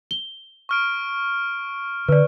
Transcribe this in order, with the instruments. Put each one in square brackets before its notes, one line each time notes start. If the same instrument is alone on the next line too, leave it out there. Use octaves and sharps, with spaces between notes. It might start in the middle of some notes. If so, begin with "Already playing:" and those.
[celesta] G7
[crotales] C#6 F6 D7
[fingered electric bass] D3 [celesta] B4 D5